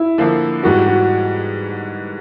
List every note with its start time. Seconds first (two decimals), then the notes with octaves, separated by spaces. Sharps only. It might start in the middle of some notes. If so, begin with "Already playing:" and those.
Already playing: E4
0.18 D3 F3 A#3
0.63 G#2 E3 G3 B3 F#4
0.86 F#4